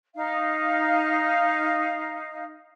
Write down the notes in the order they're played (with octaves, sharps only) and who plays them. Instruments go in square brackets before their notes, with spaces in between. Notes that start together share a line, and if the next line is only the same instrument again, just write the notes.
[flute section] D#4 F5